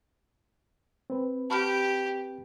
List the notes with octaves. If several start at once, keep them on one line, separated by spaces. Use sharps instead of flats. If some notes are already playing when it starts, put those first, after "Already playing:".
C4 B4
G4 A5 B5 F6